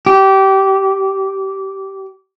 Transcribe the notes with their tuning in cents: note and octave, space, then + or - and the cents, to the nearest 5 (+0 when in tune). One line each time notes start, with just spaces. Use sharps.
G4 -20